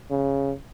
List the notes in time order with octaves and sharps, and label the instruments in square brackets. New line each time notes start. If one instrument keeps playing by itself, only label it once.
[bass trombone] C#3